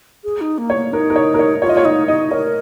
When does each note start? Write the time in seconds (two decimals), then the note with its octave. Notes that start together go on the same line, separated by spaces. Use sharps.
0.24 G#4
0.41 D#4
0.58 A#3
0.70 C#5
0.76 A#3
0.92 D#4 A#4
1.10 A#4
1.16 C#5
1.34 A#4
1.39 C#5
1.62 F4 C#5
1.69 D#5
1.77 C#5
1.85 D#4 D#5
2.08 D#4 D#5
2.31 A#4 C#5